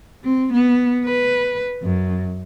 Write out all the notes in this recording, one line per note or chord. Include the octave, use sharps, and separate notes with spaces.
C4
B3
B4
F#2